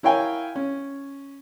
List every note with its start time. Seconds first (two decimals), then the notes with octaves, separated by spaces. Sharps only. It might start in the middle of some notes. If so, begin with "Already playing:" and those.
0.03 E4 A#4 C#5 F5 G5 G#5
0.56 C#4